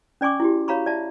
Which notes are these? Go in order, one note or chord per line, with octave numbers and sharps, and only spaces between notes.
C#4 D5 G#5 C#6 D6
E4 F#4 G4
F#4 C#5 F5 A#5 B5 C#6
D5 E5 A5